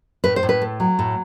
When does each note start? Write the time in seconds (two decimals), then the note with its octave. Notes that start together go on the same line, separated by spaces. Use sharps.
0.24 A2 B4
0.36 C5
0.43 A2
0.49 B4
0.62 A3
0.80 F#3
0.99 A2